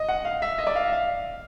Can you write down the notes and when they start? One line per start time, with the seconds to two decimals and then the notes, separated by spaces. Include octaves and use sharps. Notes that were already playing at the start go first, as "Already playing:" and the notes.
Already playing: D#5
0.09 F#5
0.25 F5
0.42 E5
0.58 D#5
0.67 D5
0.76 F5
0.88 E5
0.92 F5